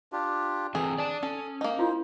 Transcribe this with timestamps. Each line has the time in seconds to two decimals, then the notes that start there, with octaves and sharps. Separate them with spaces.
0.12 D4 F4 G4
0.75 E3 C4 G#4 A4
0.98 D5 A5 D#6
1.23 C#4 A4
1.61 A#3 D#4
1.79 E4 F4 C5